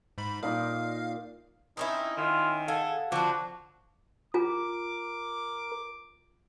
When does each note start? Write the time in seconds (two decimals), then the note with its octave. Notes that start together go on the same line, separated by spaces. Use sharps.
0.18 G#2 B5
0.43 A#2 D#4 D5 F5
1.77 C4 C#4 D#4 E4
2.18 D#3 F4
2.68 G#4 A4 F5 F#5
3.12 D3 F3 C4 F#4 D6
4.34 F4 A#4 G#5 A#5 D6